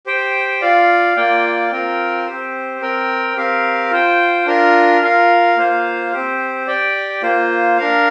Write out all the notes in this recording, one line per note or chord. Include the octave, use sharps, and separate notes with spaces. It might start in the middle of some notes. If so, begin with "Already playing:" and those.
G4 C5 G5
F4 D5 F5
A#3 F4 D5 G5
C4 F4 A#4 G5
C4 G4 C5
C4 A#4 G5
C4 G4 A#4 F5
F4 C5 G5
D4 F4 A#4
F4 A#4 F5
A#3 F4 C5 F5
C4 G4 C5
G4 D5 G5
A#3 F4 C5
D4 A#4 F5